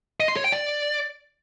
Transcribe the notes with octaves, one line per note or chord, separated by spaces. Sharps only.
D#5
C6
C#5
G5
D5